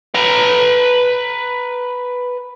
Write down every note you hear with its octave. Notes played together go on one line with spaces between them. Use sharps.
B4 A#5